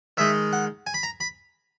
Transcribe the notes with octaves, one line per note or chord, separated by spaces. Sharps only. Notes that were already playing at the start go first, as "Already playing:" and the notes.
D#3 G#3 D#4 E5
F#5
G#5
B5
A#5
B5